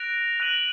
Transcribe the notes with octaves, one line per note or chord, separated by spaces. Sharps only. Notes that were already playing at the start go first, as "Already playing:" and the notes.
Already playing: F#6 A#6 D7 F7
F#6 A#6 D#7 F#7